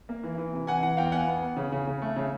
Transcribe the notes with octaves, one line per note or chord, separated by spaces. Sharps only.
A#3
E3
E3
C3
E3 F#5 G#5
E3 F#5
E2 F5 G5
E2 F#5 G#5
B3
B3
C#3
C#3
C#3
A3
C#3